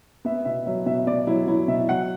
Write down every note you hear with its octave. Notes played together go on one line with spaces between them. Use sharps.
B3 E5
B2 E5
F#3 E5
B2 E5
B2 D5
F#3 E4
F#3 E4
B2 E5
F#3 F#5